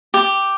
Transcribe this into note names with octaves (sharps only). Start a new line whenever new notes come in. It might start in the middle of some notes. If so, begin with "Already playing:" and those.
G4